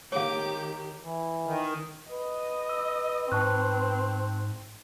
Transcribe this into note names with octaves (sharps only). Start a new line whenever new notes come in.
D#3 G4 C#5 F5 D6
E3
D#3
B4 D#5
E6
G#2 C4 A5 C#6 F#6